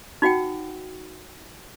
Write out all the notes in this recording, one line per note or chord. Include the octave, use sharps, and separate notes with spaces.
D#4 F#4 F#5 G5